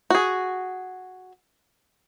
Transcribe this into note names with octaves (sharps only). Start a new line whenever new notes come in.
F#4 G#4